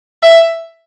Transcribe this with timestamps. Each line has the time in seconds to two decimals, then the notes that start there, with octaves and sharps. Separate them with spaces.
0.23 E5